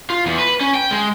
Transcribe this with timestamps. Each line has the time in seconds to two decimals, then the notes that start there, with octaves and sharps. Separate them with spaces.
0.10 F4
0.26 E2
0.39 B4
0.61 C#4
0.74 G5
0.91 G#3